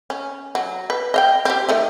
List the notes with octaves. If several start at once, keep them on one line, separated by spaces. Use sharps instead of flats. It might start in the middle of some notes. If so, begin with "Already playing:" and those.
C#4
F#3
B4
D#5 F5 G5
C4 G4
D#3 A3 D#5